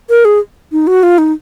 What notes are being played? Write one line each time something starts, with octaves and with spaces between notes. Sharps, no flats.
A#4
G#4
D#4
F#4
F4
D#4